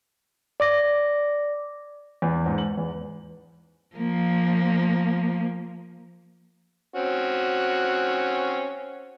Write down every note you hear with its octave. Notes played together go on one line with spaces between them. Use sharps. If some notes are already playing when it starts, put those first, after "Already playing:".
D5 D6 A#6
E2
G#2
F#7
E2
F3 A#3
C4 C#4 F#4